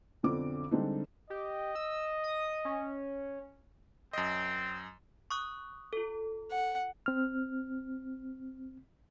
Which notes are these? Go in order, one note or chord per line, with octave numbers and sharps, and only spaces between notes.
B1 F2 D3 C4 D6
D3 G3 G#3 C4 D4 D#4
G4 D#5
E6
D#6
C#4
F#2 C4 D#5
C#6 D#6 F#6
F4 A4
F#5
C4 F6